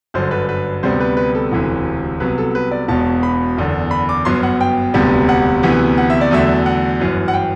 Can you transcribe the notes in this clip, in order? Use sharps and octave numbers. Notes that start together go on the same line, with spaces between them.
G1 F#2 D3 C5
B4
B4
D2 C3 G3 B3 C5
B4
B4
A4
E1 D2 C3 E3
C2 C3 F#3 B3 B4
A4
B4
D5
E1 E2 B2 A5
B5
F#1 E2 D3
B5
D6
G1 F#2 F#3 B3 C6
F#5
G5
E1 D2 C3 G3 B3
F#5
D2 C3 E3 B3
F#5
E5
D5
E2 D3 F#3 A3 E5
F#5
G1 F#2 E3
F#5
G5